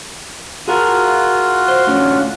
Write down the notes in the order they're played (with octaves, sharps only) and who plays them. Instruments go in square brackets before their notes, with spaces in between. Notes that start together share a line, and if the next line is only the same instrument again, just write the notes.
[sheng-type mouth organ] F4 F#4 [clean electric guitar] G#4 A#4
[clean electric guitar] C5
A2 D3 C#4